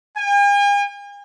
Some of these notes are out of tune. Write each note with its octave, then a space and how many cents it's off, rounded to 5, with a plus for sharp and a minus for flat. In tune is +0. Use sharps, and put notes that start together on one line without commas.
G#5 -45